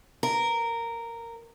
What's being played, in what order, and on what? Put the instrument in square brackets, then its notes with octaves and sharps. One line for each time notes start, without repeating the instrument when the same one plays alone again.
[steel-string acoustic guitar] A#4